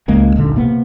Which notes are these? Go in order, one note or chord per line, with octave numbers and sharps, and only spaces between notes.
C#2 G#3 A#3 C#4
D#1 B1 D3
C3 A#3 B3